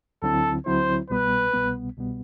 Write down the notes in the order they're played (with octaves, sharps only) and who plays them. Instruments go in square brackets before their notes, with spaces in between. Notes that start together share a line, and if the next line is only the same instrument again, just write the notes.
[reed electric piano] D2 D3 F#3 C4 E4 [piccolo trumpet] A4
[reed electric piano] D2 D3 F#3 C4 E4 [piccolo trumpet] C5
[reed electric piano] C2 B2 G3 B3 [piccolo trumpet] B4
[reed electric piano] C2 B2 G3 B3
C2 B2 G3 B3